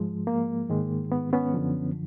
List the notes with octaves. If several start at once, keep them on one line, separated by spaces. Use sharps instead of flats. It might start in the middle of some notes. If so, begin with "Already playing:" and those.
Already playing: G#2 F3 G#3
A#3
G#2 D#3 G#3
B3
B3 C#4
F#2 D3 F3